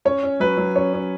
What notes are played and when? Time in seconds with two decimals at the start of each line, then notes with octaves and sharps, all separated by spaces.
0.05 C#4 C#5
0.23 C#4
0.40 F#3 B4
0.57 F#3
0.75 C#4 C#5
0.93 C#4